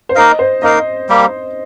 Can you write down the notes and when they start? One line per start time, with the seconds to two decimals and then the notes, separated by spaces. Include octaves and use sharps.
0.09 C5
0.15 A#3 D#4 A#4 D#5 F5
0.39 C5
0.62 A#3 D#4 A#4 D#5 F5
1.09 G3 A#3 G4